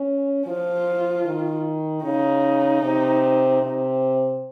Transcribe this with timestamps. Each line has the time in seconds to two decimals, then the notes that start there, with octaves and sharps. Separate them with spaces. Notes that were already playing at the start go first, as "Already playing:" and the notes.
Already playing: C#4
0.46 F3 F4
1.25 D#3
2.04 C#3 D#4
2.82 C3
3.62 C3